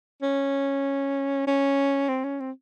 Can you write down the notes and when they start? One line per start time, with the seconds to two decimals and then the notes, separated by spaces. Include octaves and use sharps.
0.22 C#4
1.47 C#4
2.08 C4
2.24 C#4
2.40 C4